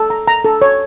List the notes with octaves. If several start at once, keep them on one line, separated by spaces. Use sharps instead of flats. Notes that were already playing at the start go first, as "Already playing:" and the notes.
Already playing: A4
A#5
A#5
A4
C#5